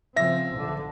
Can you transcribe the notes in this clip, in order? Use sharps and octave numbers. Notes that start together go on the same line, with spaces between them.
C#3 F3 C4 E5 A#6
B1 D3 F3